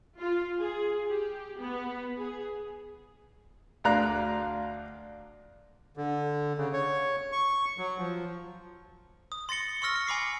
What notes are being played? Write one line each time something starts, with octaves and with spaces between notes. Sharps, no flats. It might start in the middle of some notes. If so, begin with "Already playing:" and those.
F4
G#4
G4
B3
G#4
D2 D4 D5 F5 A#5 F#6
D3
C#3
C#5
C#6
F#3
F3
D#6
C6 A6 A#6 C#7 G7
C6 C#6 E6 F6 A#6
C#7
G#5 B5 D6 C7